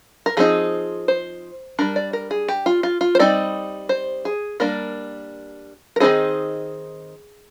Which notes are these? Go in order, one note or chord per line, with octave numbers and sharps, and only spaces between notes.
A#4
F3 C4 D#4 G#4
C5
G3 D4 A#4
D5
A#4
G#4
G4
F4
F4
F4
C5
G3 C4 D#4 D5
C5
G#4
G3 A#3 D4 A#4
A#4
D#3 G#3 C4 D#4 G#4